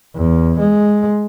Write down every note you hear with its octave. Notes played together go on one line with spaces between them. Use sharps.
E2
G#3